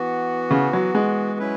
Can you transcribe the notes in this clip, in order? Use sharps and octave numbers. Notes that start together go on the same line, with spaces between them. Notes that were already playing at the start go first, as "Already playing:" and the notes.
Already playing: E3 B3 F#4
C#3
F#3
G#3
F#3 C#4 E4 B4